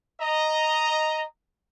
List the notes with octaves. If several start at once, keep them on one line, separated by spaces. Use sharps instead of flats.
D#5 A#5